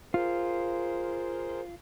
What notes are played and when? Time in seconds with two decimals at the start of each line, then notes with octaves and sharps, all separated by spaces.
0.14 F4 G#4 A#4 C5